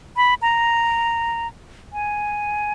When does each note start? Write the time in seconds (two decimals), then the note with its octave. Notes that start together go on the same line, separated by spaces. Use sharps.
0.17 B5
0.42 A#5
1.93 G#5